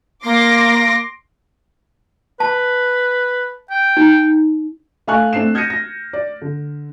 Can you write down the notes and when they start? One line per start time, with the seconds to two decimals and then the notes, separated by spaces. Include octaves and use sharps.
0.24 A#3 C6 D6 A#6
2.40 B4 A5
3.71 G5
3.97 D#4
5.07 A3 F5 G#5 C#6 F#6
5.33 A3 C4 D4 C7 E7
5.54 F6 G6 G#6 A#6 C#7 D#7
5.70 A#6
6.13 D5
6.42 D3